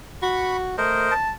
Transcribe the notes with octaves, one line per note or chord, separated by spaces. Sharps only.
F#4 B5 C#6
A3 A#4 C5 D#5
A5